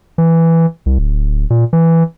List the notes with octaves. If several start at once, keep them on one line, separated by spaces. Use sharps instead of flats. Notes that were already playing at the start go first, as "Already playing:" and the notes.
E3
C2
D1
A#2
E3